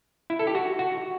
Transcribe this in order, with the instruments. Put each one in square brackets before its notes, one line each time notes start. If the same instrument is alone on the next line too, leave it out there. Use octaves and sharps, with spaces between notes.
[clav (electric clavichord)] E4
A4
G4
F#4
F#4